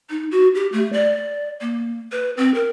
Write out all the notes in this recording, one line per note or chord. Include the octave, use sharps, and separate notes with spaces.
D#4
F#4
G4
A3
D5
A#3
B4
C4
A#4